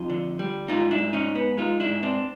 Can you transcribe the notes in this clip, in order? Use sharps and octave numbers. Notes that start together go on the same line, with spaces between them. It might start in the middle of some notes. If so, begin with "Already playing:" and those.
Already playing: F2 D#4 F4
D3
G3
G#2 D#4 F4
D4 E4
G#2
C#4 D#4
G#2
B3
G#3 D#4 F4
D4 E4
G#2
C4 D4